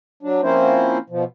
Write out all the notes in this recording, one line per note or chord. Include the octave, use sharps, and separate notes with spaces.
F#3 D4
F3 A#3 C4 C#4 E4 C5
B2 F3